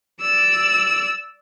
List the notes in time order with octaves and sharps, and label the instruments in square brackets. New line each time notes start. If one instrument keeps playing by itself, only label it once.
[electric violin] D5 E6